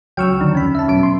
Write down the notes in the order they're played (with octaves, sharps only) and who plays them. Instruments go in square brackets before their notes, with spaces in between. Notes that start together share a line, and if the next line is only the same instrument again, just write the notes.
[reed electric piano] C#2 F#3 F6 [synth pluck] G5 C#6 E6
[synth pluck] D3 D#3 D4
[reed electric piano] F2 [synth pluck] C#4 B5
[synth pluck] E5 A5
[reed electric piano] B2 [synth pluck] F#3 C#4 D7
[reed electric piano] C6